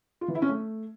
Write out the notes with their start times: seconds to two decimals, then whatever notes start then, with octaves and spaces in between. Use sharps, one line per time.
0.21 F4
0.28 E3
0.35 E4
0.42 C#4
0.49 A3